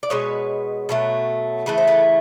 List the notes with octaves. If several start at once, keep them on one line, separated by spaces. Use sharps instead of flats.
D5
B2 G#3 B4 C#5
B2 F#3 A3
C#3 E3 A3 B4
C5
A4 B4